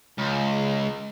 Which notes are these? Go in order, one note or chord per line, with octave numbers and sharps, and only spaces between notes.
C#2